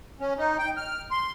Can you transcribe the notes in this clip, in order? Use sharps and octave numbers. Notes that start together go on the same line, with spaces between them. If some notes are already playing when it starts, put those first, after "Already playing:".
C#4
D#4
G5
F6
C6